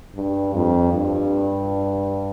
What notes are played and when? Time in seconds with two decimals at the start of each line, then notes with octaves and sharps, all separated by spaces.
0.15 G2
0.54 F2
0.93 G2